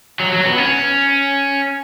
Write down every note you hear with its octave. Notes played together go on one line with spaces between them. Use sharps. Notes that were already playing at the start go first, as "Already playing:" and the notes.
F#3
F#3
B3
C#4